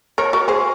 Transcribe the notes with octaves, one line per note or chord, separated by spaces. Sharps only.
A#4 C#5
F#4 A#4
G#4 C5